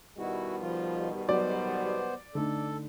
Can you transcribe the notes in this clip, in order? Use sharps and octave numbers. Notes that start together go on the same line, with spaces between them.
B2 D#3 G3 E4 F#4
F3 F4
F#3 B3 C5 D5
D3 A3 D#4 A4